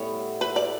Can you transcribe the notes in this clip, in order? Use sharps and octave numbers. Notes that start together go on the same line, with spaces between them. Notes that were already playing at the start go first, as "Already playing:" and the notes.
Already playing: A2 G3 B3 E4 C#5
B4
D5